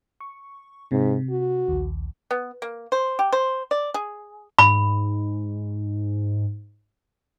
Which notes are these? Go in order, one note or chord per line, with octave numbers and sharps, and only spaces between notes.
C#6
G#2 C3
F#4
A#1 D#2
B3
A#3
C5
G4
C5
D5
G#4
G#2 B5